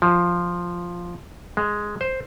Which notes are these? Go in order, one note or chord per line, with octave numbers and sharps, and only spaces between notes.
F3
G#3
C5